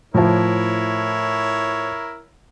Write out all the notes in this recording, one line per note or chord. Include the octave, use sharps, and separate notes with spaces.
A2 F3 E4 A#4 C#5